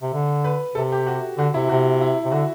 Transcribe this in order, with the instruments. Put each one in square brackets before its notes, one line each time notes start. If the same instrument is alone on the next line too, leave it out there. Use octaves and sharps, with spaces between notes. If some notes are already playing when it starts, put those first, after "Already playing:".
[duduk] C3
D3
[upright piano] B4
[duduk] C3 [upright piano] A4
[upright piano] G4
F#4
[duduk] D3 [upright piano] F#4
[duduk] C3 [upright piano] E4
[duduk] C3 [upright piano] F#4
[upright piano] E4
[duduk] C3
[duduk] D3 [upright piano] F#4